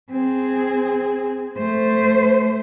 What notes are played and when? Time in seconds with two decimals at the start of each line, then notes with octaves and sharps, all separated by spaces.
0.11 C4 G#4
1.58 A3 C5